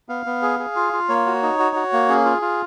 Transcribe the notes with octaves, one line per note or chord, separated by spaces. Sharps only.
B3 F5
B3
G#4
G#4
F4
F4
A#3 C#5
F#4
D#4
F#4
F#4
A#3
C#4 G#4
F4
F4